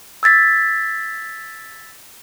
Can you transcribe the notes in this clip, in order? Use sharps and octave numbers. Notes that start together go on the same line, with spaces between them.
E6 G#6 A6 B6